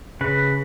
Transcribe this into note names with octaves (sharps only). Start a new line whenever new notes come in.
C#3 B4